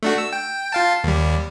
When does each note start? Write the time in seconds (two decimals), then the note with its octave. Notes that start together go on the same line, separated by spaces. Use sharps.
0.03 A3 D4 F#4
0.18 E6
0.33 G5
0.72 F4 F5 A5
1.04 D#2 G3